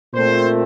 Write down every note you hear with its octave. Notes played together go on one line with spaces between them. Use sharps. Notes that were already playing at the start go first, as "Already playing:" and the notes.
A#2 A3 C4 C5